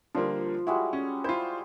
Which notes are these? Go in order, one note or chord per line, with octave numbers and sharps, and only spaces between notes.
D3 F3 G3 A#3
G3 G#3 E4 F#4
C#4
E4 F4 C5